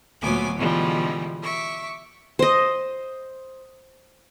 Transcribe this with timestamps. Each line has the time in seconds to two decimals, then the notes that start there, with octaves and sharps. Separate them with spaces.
0.21 D2 A#2 F#3 B3 G#5 D6
0.56 B2 D3 E3 F3 G3 G#3
1.42 E5 C#6 D6
2.39 C5 D#5